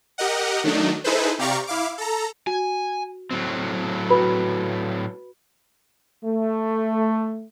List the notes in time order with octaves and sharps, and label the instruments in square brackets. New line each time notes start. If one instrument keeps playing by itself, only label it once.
[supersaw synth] G4 A#4 D#5 F#5
D#3 F#3 A3 D4 D#4
D#4 E4 G#4 A4 B4 C5
C3 G4 D5 F5 A#5 C#6
E4 F5 D6
A4 A#5
[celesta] F#4 [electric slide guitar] G#5
[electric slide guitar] A2 F#3 C4
[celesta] F#4 B4 B5
[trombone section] A3